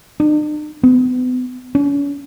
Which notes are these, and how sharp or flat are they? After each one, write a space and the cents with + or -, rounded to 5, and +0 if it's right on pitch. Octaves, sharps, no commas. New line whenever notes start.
D4 +45
B3 +35
C#4 +40